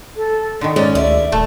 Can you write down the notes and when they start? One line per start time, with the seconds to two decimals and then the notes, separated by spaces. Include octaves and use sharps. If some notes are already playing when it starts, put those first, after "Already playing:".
0.16 A4
0.61 D3 D#3 D#4
0.76 G#2 G#3 C#4 D5
0.95 D2 D5 E5
1.32 D#1 A3 A5